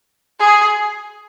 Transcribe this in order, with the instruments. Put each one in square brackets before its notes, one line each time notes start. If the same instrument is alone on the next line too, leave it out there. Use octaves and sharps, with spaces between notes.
[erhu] G#4